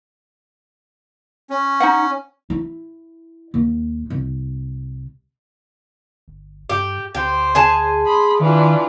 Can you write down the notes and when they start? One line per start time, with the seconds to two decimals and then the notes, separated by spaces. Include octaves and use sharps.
1.50 C#4
1.80 D#4 F#5
2.50 E4
3.54 D#2
4.10 C2
6.28 G1
6.69 G2 G4
7.15 D2 G4 C5
7.55 G#4 G#5 A5
8.04 B5 C6 D#6
8.40 D#3 E3 D4 F4